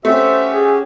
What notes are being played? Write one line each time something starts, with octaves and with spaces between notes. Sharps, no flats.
A3 C#4 F#4 G4 C5 E5
G#4